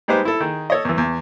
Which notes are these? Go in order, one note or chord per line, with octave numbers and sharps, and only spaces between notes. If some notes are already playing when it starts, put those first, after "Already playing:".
G3 G#3 D#4 G4 B4 C5
E4 A4
D#3 G#4
A4 C#5 D#5
E2 E3
E2